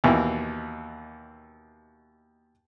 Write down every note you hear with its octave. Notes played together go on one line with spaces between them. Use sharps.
D#2 B2 E3